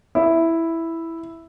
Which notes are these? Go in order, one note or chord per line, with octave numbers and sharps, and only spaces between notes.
E4